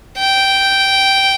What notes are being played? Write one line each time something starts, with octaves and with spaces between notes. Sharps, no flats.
G5